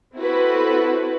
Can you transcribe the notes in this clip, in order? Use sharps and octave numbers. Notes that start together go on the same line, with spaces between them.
C4 E4 F#4 A4 B4